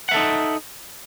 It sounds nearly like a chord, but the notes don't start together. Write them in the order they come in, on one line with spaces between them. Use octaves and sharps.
F#5 E5 A4 D#4